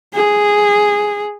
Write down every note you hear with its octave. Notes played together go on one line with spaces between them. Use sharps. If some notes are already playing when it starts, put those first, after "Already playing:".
G#4